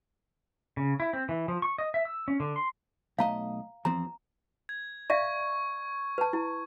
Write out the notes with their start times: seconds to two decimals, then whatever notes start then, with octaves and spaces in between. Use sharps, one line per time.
0.77 C#3
1.00 E4
1.13 C4
1.29 E3
1.48 F3
1.62 C#6
1.78 D#5
1.94 E5
2.05 E6
2.28 C#4
2.40 D3
2.56 C6
3.19 B1 A3 D#5 F5 A#5
3.85 E2 F3 C4 A#5
4.69 G#6
5.10 D5 E5 F5 C#6
6.18 B4 A5
6.33 E4